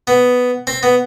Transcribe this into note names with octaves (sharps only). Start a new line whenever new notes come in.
B3
C4
B3